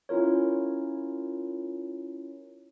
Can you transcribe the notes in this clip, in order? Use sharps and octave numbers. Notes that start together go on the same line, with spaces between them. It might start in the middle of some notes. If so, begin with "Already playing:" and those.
C#4 E4 F4 A#4 C#5